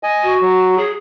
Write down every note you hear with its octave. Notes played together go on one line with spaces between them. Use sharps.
D#5 G#5
F#4
F#3
G#4